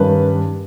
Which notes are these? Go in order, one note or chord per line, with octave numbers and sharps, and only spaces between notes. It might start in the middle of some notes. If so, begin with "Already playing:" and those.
Already playing: G2 D#3 G3 C#4 B4